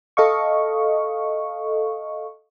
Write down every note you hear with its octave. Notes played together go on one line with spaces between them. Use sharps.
A4 D#5 F5 C#6